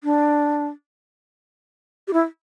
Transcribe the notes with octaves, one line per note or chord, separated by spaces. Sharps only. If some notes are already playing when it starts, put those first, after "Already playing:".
D4
G4
E4